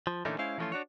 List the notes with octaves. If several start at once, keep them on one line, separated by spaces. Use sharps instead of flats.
F3
A#2 D3 E3 A3 C#4 D#4
G#3 C#4 E4 C5 F5
E3 F3 G3 A3 C#4 F4
D4 F#4 C#5